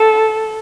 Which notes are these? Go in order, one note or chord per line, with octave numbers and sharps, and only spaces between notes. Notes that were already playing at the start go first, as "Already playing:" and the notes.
Already playing: A4